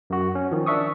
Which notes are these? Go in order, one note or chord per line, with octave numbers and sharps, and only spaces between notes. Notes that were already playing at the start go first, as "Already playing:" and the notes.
F#2 F#4
C#4
D#3 F3
D4 E5 C#6 D#6